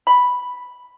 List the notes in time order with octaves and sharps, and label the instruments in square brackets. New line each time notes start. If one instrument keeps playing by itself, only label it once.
[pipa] B5